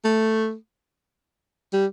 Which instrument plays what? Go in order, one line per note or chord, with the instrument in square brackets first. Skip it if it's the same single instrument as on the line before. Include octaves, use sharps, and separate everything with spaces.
[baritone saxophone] A3
G3